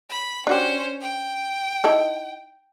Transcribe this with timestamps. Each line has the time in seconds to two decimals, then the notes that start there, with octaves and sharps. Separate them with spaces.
0.10 B5
0.47 C#4 D4 F#4 G4 C5
1.01 G5
1.84 D#4 E4 A4